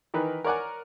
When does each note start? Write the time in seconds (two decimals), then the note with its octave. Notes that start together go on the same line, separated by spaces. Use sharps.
0.14 D#3 E3 A#4 B4
0.44 A#4 C#5 D5 F#5 G#5